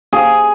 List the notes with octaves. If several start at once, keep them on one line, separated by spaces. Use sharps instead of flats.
G#4